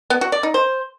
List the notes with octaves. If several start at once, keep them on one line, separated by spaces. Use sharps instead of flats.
B3
F#4
D5
D#4
C5